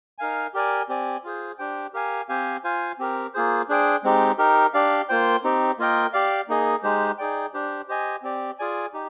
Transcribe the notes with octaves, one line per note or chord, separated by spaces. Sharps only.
D#4 A#4 F5 G#5
G4 A#4 D5 G#5
C4 G4 D5 G#5
F4 G#4 C5
D4 G4 C5 G5
G4 A#4 F5 G#5
C4 G4 C5 F5 G#5
F4 C5 F5 G#5
C4 G4 A#4
A#3 F4 G#4 C5
D4 G#4 C5 G5
G#3 C4 D#4 G4
D#4 G4 A#4
D4 G4 D5 F5
A#3 F4 C5 G5
C4 D#4 G4
A#3 F4 A#4 D#5 G5
G4 D5 F5
A#3 D#4 G#4 D#5
G#3 D#4 G4 C5
D#4 G#4 D5 G5
D4 G4 C5
G4 C5 D#5 G#5
C4 G4 D5
F4 G#4 D5 G#5
D#4 G4